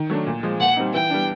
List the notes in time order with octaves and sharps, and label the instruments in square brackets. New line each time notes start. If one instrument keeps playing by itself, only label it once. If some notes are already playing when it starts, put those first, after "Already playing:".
Already playing: [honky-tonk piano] D#3
F#3 A3 D4
A#2
F3 G#3
[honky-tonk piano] A#2 [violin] F#5
[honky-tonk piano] G3 C4 D#4
[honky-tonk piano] E3 [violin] G5
[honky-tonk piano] G3 B3 D4